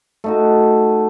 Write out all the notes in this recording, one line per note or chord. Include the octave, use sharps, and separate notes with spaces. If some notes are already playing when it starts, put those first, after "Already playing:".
A3 D#4 F#4